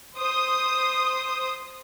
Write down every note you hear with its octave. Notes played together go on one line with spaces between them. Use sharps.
C5 D#6